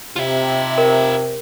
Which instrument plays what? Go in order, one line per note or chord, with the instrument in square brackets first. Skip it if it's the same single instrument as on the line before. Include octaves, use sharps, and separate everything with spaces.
[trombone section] C3 [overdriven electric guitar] F4 E5
[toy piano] A#4